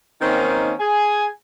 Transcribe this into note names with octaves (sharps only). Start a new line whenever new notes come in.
D#3 A#3 C4 C#4 D#4
G#4 G#5